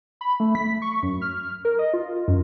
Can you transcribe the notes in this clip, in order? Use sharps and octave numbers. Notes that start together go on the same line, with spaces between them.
B5
A3
B6
C#6
F#2
F6
A#4
D#5
F4
F#2